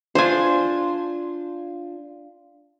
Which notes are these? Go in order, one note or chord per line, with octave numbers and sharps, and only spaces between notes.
D4 F4 C5 G#5